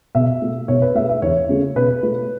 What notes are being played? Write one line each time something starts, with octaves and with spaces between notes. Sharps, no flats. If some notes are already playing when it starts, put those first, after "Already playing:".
B2 E5
A3
B2 C#5
B4
A3 E5
E5
E2 C#5
C#3 A3
B2 B4
A3